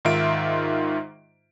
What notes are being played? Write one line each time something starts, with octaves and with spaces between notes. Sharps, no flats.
G#2 D#3 F4 E5 D7